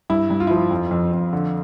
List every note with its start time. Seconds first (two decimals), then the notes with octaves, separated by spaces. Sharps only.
0.10 G2 E4
0.30 G2
0.40 F4
0.47 E4
0.51 F3 F4
0.71 F2
0.91 F2
1.12 F2
1.33 D3